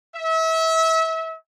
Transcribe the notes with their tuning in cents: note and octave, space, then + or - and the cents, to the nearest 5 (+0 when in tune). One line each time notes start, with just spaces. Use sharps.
E5 -30